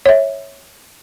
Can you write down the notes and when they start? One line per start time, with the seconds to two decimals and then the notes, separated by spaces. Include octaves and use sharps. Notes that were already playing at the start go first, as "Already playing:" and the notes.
0.06 C#5 E5